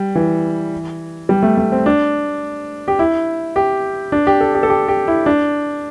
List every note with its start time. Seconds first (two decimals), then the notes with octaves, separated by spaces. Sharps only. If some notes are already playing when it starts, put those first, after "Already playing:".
Already playing: G3
0.15 E3
1.29 G3
1.43 A3
1.57 A3
1.72 C4
1.86 D4
2.88 G4
2.99 E4
3.56 G4
4.12 D4
4.27 G4
4.41 A4
4.55 G4
4.63 A4
4.70 G4
4.88 G4
5.08 E4
5.26 D4